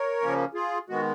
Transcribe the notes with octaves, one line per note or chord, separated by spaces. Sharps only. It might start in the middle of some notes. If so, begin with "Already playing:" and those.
Already playing: A#4 C#5
C#3 F3 A#3 C#4
F4 G#4
D#3 G#3 B3 F#4